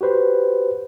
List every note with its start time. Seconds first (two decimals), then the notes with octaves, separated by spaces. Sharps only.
0.01 F#4 G4 B4 C5